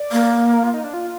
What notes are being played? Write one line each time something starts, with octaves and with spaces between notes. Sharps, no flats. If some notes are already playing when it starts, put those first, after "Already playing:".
Already playing: D5
A#3
A#4
F4
D#4
D4
F4